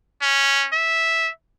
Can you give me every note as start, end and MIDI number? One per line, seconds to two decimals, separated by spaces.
0.22 0.68 61
0.73 1.30 76